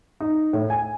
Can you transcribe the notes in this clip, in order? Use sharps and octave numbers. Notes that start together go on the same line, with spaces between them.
D#4
A2
G#5